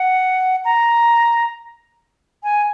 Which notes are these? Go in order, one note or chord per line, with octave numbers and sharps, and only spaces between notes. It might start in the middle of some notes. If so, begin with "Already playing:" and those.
Already playing: F#5
A#5
G#5